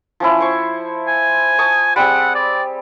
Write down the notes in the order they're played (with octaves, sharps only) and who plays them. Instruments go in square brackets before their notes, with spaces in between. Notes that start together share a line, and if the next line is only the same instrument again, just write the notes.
[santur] F3 C#4 E4
C5 C#6
[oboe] G#5
[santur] A5 C#6 D#6
[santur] G3 C4 G#4 [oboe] F#5
[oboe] D5